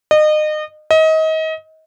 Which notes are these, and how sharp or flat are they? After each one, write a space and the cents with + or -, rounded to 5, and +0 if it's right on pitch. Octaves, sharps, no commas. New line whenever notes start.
D#5 -30
D#5 +30